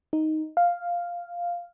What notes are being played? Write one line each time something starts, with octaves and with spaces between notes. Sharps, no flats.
D#4
F5